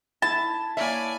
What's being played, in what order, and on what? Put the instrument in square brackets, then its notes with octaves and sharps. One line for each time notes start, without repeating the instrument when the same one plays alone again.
[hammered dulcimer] E4 [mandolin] A5
[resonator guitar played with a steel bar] A#3 C#5 E5 [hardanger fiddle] D5 G#5